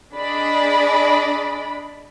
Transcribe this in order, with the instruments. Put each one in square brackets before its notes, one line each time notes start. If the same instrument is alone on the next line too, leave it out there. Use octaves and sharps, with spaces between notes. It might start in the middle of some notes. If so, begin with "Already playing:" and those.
[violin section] D4 G#4 D5 D#5 B5